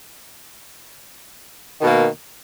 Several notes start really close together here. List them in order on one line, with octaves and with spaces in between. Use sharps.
D#3 B2 A#3